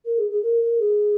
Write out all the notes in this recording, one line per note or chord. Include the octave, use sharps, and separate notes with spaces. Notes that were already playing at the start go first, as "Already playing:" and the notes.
A#4
G#4
G#4
A#4
A#4
G#4